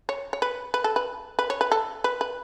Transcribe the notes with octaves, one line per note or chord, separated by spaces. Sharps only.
C#5
C#5
B4
B4
A4
B4
B4
C#5
B4
A4
B4
B4